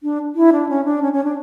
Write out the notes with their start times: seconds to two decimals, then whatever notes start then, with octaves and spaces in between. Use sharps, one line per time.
0.03 D4
0.35 E4
0.53 D4
0.69 C#4
0.85 D4
1.02 C#4
1.13 C#4
1.24 D4